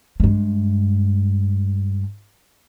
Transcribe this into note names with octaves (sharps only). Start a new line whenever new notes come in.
G2 G#3